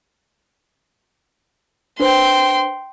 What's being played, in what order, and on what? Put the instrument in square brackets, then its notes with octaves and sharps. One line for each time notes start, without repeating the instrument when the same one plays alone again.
[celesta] D4 B4 C5 [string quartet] G5 C6